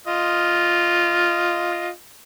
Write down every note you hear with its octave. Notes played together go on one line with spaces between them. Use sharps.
F4 D#5